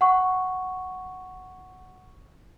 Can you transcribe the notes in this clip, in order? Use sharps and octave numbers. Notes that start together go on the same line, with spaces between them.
F#5 C#6